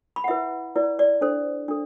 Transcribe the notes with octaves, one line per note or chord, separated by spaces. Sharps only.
B5
F#5
E4 B4 E5
E4 B4 D5
D5
D4 A4 C5
D4 A4